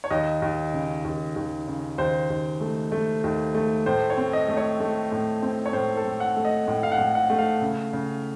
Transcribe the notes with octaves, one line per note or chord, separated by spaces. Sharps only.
C#5
D#2 D#5
D#2
C#3
D#2
D#2
C#3
D#2 C5
D#2
A3
A3
D#2
A3
A2 C5
C#5
C4
D#5
A3
C#5
A3
A2
C4
C#5
A2 C5
A4
A2
F#5
A3
D#5
A2
F5
F#5
A2
F#5
A3
F5
C#3
C#3